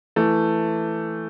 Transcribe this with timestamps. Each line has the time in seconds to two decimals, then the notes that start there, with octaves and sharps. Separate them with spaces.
0.16 E3 A3